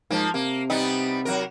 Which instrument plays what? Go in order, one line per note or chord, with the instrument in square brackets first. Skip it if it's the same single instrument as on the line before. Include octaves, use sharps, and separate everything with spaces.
[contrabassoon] G#2 [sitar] F3 A#3
[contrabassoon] C3 [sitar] A#3
[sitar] G3 B3 D#4
F#3 F#4 A#4